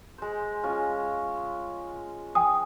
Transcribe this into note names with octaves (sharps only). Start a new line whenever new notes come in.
G#3 C5
G#3 C#4 F4
G5 G#5 D#6